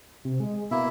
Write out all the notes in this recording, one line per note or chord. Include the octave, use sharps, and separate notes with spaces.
C3
G#3
B2 A#3 E4 E5